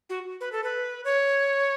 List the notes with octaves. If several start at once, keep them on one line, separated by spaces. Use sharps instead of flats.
F#4
B4
A4
B4
C#5